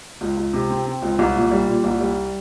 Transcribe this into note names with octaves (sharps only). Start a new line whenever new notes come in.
C#2
C#2
C3
C4
C4
C#2
C2
A#2
G3
A#2
C2
G3